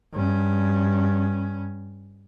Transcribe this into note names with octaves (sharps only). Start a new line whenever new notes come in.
G2 C#4